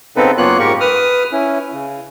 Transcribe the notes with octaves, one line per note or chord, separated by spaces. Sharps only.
C#3 B3 C4 D#4 A4 B4
F#2 A#3 B3 F4 C#5 F#6
G#2 G#3 G4 A#4 C#6
B4 D#6 F6
C#4 E4
C#3